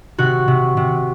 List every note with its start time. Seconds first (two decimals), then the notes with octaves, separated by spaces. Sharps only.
0.18 C3 F#4
0.48 C3
0.77 C3